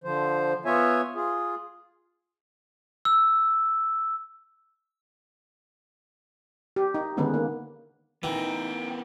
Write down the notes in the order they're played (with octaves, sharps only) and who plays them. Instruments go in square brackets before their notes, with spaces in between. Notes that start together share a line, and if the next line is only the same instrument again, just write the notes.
[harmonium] D3 F3 C5
B3 F4 C#5 E5 G#5
F4 G#4
[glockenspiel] E6
[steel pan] G4
D#4
D3 D#3 G#3 B3 C#4 D#4
A#3
[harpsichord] E3 [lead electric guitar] B3 A#4 [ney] D#4 [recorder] G5